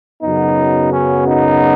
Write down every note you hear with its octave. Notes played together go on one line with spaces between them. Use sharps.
F#2 C#3 F#3 B3 D#4
C#4
D#4